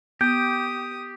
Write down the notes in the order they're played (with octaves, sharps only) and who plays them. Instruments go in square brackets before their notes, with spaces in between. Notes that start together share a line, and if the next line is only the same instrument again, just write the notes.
[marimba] B3 [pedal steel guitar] G4 [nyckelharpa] D#6 [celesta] G6